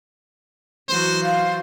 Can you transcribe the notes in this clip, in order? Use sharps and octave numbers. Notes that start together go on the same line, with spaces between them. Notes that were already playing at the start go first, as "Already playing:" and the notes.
E3 F#3 F#4 C5
C5 F5